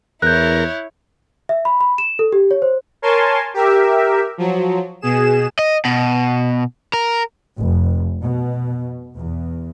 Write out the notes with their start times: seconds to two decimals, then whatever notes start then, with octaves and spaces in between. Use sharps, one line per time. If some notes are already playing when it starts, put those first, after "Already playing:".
0.22 E2 E4 A#4 C#5 F#6 G6
1.49 E5
1.65 B5
1.81 B5
1.98 E7
2.19 A4
2.33 G4
2.51 C#5
2.62 C5
3.02 A#4 C#5 G#5 A5 C6
3.54 G4 A#4 E5
4.38 F3 F#3
5.01 B2 G#4 E7
5.59 D#5
5.85 B2
6.93 A#4
7.58 F1
8.21 B2
9.16 E2